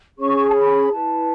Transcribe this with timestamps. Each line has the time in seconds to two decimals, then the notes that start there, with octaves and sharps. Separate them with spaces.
0.17 C#4 G#4 C#5 C#6
0.49 A5
0.55 B5
0.92 E4 B4 A5